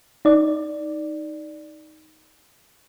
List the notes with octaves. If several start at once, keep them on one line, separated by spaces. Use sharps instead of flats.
D#4 D5